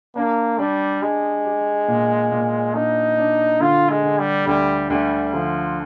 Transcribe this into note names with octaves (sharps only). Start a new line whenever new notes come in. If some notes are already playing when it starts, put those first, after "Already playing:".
A#3 D4
G3 D4
G#3 G4
G4
A#2
A#2
D4 D#4
D4
D3 F4
G#3
D3
G3
D2 G3
D2 G3
D3 F3